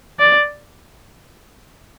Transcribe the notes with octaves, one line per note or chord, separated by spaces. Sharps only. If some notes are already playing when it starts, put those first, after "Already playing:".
D5